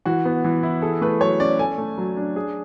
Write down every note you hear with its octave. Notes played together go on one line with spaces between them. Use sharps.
E3 F#4
B3
E3
E4
G#4 A4
A3 B4
F#3 C#5
C#4 D5
A4 G#5
A3
F#3
D4
G#4